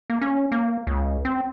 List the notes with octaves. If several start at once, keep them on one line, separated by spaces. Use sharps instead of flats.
A#3
C#4
A#3
C#2
C4